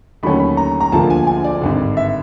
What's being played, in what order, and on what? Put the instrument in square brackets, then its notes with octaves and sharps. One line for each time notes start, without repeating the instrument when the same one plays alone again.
[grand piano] D#2 D3 F#3 A3 C#4 B5
B5
A#5
A#5
E1 D2 D3 F3 A#3 A5
G#5
G#5
D5
G#1 G2 D3
E5